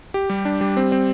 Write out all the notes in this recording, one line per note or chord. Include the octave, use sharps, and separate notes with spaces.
G4
G3
D4
G3
C4
C4